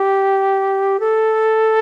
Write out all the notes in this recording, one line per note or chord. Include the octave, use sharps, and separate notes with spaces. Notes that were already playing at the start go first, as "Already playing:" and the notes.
Already playing: G4
A4